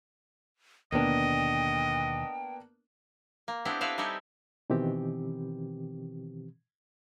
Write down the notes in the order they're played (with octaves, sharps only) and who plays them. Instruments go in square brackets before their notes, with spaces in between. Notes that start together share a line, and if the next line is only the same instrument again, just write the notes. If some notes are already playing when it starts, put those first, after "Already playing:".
[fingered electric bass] D#2 B2 D3 [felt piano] A#3 B3 D4 [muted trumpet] D#5 [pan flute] G5
[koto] A#3
B3 C4 D4 E4 G4
C4 E4 A4 B4 E5 F5
G3 D#4 E4 G4 A4 G#5
[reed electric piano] B2 D#3 E3 C4 G4